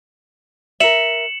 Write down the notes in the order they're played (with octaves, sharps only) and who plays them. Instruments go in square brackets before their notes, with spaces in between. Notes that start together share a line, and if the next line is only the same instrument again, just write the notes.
[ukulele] A#4 E5 [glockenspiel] C#7 E7 F#7